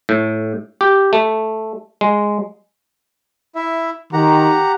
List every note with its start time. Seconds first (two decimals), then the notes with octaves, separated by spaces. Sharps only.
0.09 A2
0.81 G4
1.13 A3
2.01 G#3
3.55 E4 E5
4.13 D#3 G4 F#5 A#5